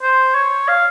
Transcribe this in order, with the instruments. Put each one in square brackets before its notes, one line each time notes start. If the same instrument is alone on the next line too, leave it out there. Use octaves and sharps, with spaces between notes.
[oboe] C5
C#5
F5